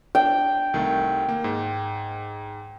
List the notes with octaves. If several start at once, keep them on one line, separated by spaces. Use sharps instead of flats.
D4 G5
C2 D#3 A3
A#3
G#2